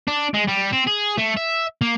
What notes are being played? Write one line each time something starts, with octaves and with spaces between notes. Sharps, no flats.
D4
G#3
G3
C4
G#4
A3
E5
A#3